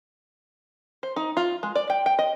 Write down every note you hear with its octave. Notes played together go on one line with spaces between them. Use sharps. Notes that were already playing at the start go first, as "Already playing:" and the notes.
C5
D#4
F4
G#3
D5
G5
G5
D#5